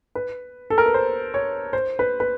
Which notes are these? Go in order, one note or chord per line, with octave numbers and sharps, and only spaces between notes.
B4
A4
A#4
B4
C5
C#5
C5
B4
B4